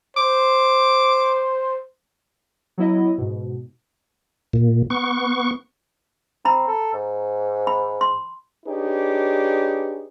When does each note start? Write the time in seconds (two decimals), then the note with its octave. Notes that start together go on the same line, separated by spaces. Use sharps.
0.17 C5 D6
2.78 F#3 B3 E4 D#5
3.18 G#2 B2
4.53 A#2
4.90 B3 C#6
6.45 C4 A#5 B5
6.68 A4
6.94 G#2
7.67 B5
8.01 C6
8.66 D4 D#4 G4 G#4 B4 C#5